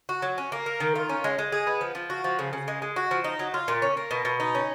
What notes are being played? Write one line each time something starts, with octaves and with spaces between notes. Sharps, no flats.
F#4
F#3
C#4
A#3
A#4
D#3
F4
C#4
G#3
G#3
G#4
B3
F3
F3
F#4
F3
C#3
C#3
G#3
G#3
F#4
F3
D#4
F#3
F4
A#2
C#4
A#3
B2
B2
D#4
C#4